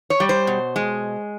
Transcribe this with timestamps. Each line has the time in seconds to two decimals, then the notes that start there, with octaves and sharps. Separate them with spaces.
0.10 C#5
0.20 G3
0.29 C5
0.47 B2
0.76 G#3